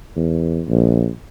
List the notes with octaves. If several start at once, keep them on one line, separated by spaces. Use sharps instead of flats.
E2
A#1